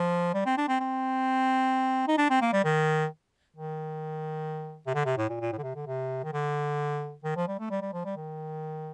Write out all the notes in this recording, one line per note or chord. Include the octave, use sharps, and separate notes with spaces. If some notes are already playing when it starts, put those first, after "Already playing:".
Already playing: F3
G3
C4
D4
C4
C4
D#4
D4
C4
A#3
G3
D#3
D#3
C3
D3
C3
A2
A#2
A#2
A2
D3
C3
D3
C3
D#3
D3
D#3
F3
G3
A3
G3
G3
F3
G3
D#3